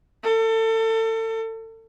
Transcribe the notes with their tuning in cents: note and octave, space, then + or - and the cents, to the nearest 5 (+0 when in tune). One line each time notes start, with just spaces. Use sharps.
A4 +30